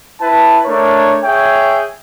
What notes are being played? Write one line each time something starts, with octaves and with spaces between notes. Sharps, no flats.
E4 B4 A5
A3 D4 A#4 C#5
G#4 C#5 E5 G5